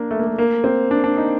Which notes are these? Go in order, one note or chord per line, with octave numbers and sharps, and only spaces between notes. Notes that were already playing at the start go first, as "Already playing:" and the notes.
Already playing: A#3 D4
A3
A#3
A3
A#3
C4
D4
D4
D#4